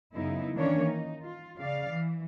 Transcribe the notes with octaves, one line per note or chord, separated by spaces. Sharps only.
F#2 C#3 B3 D#4 E4
D#3 E3 A#3 C#4 D4 C#5
D#4
F4
C#3 D5 F5
E3